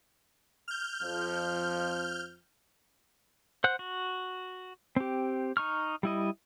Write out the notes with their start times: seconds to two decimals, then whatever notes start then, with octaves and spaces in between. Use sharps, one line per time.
0.68 F6 G6
1.02 F2 F3
3.64 C5 F#5 F#6
3.79 F#4
4.96 C4 G4
5.57 D#4 C#6 F6
6.03 G3 E4 D#5